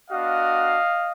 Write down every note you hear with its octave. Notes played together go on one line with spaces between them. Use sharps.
B3 D4 F#4 D#5 F5